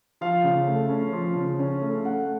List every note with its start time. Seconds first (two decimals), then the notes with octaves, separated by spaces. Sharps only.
0.21 F3 F5
0.44 C#3
0.67 A3
0.90 C#4
1.13 F3
1.36 C#3
1.59 C#4
1.81 A3
2.04 A3 F#5